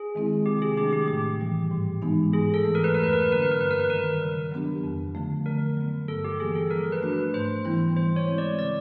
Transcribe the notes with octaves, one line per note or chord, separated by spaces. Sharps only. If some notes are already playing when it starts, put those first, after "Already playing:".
Already playing: G#4
D#3 G#3 C4 E4
C3 G4
G#4
D#3 F#3 A3 D4 G4
G4
A2 G4
E3 G3
G#2
E3 G#3 B3 D#4
G#2 G#4
A4
E3 A3
A#4
B4
F2 A#4
B4
A#4
B4
D3 F#3 A#3 C#4 A#4
B4
A#4
G2 B4
A#4
B4
D#3 G3 A#4
C#3
F#3 B3 D4 G4
F2
D3 F3 A3
D3 A#4
F#3 B3
G2 A4
G4
E3 G3 A#3 G#4
A4
F3 A#4
B4
A3 D4 F#4
B4
G#2 C5
E3 G3 B3 E4
E3 C5
C#5
G#3 C4 E4
D5
C#3 D5